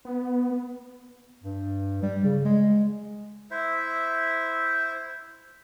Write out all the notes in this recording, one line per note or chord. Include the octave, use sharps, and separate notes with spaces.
B3
G2
G3
C#3
G#3
E4 C5 E5